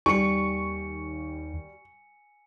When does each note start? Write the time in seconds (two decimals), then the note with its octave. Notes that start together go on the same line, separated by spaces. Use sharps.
0.06 D#2 G3 G#5 C#6 C#7